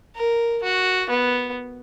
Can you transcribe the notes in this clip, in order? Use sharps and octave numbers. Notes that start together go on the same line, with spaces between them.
A#4
F#4
B3